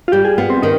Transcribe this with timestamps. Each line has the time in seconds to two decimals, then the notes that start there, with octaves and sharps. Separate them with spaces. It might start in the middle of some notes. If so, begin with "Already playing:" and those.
0.08 F4
0.12 G3 G4
0.25 G#4
0.38 B3 F4
0.50 C4
0.62 D#3 D#4